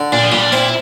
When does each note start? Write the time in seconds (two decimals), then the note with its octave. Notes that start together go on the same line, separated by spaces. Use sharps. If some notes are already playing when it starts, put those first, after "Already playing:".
Already playing: D3
0.12 A#2 D4
0.22 F3
0.32 A#2 G3
0.42 D4
0.52 C4 E4